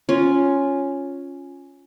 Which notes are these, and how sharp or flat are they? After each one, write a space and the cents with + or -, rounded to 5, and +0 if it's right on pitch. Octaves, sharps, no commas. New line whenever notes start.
C#4 +0 F4 +0